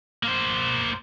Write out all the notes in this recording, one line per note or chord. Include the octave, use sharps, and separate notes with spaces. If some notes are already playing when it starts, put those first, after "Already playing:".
A#3 C5